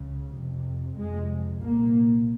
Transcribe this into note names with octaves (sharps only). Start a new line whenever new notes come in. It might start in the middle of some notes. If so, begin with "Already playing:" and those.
Already playing: C#2 C#3
F2 C3
F2 C3 G#3
C2 A#2 A#3